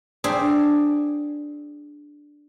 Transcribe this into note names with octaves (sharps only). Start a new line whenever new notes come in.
D4 G#4 C5 E5 G5